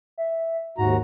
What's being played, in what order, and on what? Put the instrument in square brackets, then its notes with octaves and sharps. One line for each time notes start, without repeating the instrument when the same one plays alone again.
[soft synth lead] E5
[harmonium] D#2 F#4 A#5 [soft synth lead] G#2